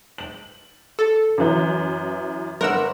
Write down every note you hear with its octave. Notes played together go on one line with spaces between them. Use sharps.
F#7
A4
F#2 E3
G1 A#4 F#5 E6